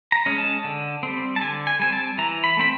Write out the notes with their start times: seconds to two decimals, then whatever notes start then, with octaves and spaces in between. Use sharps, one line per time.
0.12 A#5
0.26 G#3 C#4
0.38 A5
0.64 D3
1.03 G3 C4
1.36 A5
1.41 D3 G#5
1.67 G#5
1.79 G3 C4 G#5
1.92 A5
2.18 E3 A#5
2.44 B5
2.57 A3 C4 B5